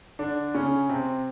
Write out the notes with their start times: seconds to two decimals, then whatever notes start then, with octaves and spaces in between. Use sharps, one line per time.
0.19 D3 D4
0.55 C#3 C#4
0.89 C3 C4